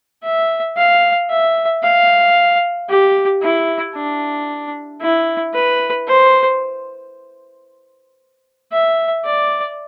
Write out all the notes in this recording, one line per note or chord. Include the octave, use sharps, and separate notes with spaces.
E5
F5
E5
F5
G4
E4
D4
E4
B4
C5
E5
D5